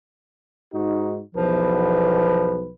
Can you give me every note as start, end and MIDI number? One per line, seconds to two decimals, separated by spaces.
0.72 1.20 44
0.72 1.20 63
0.72 1.20 66
1.35 2.71 35
1.35 2.71 40
1.35 2.75 53
1.35 2.71 71